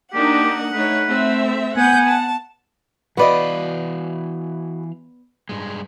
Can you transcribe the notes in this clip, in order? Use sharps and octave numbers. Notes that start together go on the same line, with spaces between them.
A#3 D4 D#4 G4 F#5
A3 D#4 B4 C#5
A3 C4 E5
B3 F#5 G#5 G6
A5
E3 B3 F#4 B4 D5 D#5 F5
G2 G#3